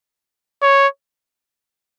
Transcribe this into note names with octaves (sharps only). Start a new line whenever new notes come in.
C#5